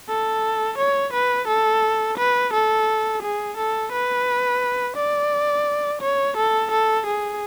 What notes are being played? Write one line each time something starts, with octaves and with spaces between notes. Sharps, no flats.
A4
C#5
B4
A4
B4
A4
G#4
A4
B4
D5
C#5
A4
A4
G#4